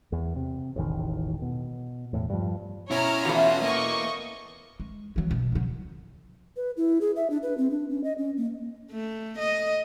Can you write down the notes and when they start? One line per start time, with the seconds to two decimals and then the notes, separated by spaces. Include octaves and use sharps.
0.12 E2
0.36 C3
0.76 E1 A1 D#3
1.42 B2
2.13 E2 A2
2.30 G2 F3
2.91 B2 C#4 E4 C#5 A#5 F6
3.25 E2 E3 A3 F4 F#4
3.62 A#3 D#5 C#6
4.80 G#3
5.16 E3 F#3
5.31 B2
5.52 C#3 F#3
6.56 B4
6.77 E4
7.01 G#4
7.16 E5
7.30 D4
7.43 B4
7.58 C4
7.71 D4
7.90 C#4
8.04 D#5
8.18 C#4
8.37 A#3
8.91 A3
9.39 D#5